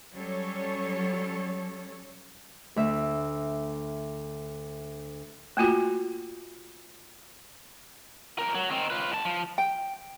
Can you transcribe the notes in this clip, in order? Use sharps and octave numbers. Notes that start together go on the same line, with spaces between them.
F#3 G3 C#4 A4 C#5
D2 E5
A3 A#3 F4 F#4
F2 A#4
F#3
D#3 C4
F4 B4
G#2 A5
F3
G5